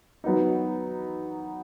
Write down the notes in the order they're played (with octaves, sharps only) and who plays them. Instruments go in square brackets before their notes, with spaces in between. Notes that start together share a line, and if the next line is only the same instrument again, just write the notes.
[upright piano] F#3 B3 D#4